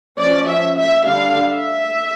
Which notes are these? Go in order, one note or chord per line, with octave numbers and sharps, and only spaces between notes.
F3 C#4 D5
E5
E5
D3 G3 D4 F5
E5